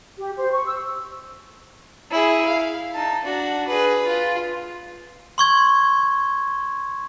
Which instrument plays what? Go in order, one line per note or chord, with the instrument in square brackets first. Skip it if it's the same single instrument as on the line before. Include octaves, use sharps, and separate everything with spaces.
[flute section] G4
C5
C#6
E6
[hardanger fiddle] E4 G#4
F5
D#4 A5
D4 F#4
G#4 B4
F4
[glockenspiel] C6 C#6 G#6